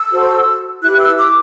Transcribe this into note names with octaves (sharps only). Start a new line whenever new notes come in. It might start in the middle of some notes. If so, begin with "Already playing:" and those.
Already playing: E6
F#4 A4 C5
E4 G4 B4 F#6
E6
D6